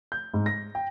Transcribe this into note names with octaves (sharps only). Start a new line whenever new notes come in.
G6
G#2
A#6
G5